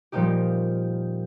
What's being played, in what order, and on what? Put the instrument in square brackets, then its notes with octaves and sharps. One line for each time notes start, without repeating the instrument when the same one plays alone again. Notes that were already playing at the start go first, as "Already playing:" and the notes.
[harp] A#2 F3 G3 A#3 D#4 G4